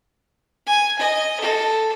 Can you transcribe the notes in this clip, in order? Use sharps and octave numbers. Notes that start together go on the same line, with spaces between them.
G#5
D#5
A4